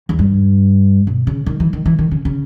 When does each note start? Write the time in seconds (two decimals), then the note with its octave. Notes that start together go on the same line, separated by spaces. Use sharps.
0.09 E2
0.19 G2
1.07 B2
1.27 C#3
1.46 D#3
1.60 E3
1.73 D#3
1.86 E3
1.99 D#3
2.11 C#3
2.25 C#3